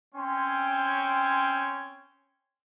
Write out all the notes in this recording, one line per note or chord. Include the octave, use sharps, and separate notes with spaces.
C4 C#4 G5 G#5 C6